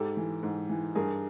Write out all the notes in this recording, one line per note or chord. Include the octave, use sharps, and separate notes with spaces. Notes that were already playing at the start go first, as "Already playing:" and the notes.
Already playing: G#2 G4 A4
E3
G#2
E3
G2 G#4 A#4